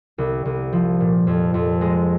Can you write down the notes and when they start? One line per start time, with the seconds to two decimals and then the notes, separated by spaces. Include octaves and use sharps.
0.18 C2
0.45 C2
0.73 F3
1.00 A#2
1.27 F2
1.54 F2
1.81 G#3